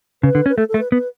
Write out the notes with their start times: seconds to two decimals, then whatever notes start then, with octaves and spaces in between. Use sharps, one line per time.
0.23 C#3 B4
0.35 D3
0.46 C#4
0.49 B4
0.57 A3 A4
0.69 A4
0.74 A3
0.80 B4
0.92 B3 B4